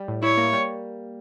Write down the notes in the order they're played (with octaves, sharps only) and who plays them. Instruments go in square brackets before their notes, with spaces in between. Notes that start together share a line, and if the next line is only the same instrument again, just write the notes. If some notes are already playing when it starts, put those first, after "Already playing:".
Already playing: [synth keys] G3
A2
[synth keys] E4 [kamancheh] C#5
[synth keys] A#3
G3